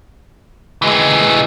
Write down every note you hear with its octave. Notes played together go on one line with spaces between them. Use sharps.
E3 G#3